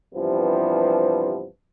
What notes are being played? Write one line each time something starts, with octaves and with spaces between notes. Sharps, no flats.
G2 C3 E3 F3 B3